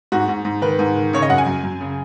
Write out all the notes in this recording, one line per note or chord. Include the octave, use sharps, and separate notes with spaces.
G#2 F#4
G#2
G#2
D#3 B4
G#2
D#3
C#3 C#5
D#5
F#2 F#5
G#5
F#2
F#2
C#3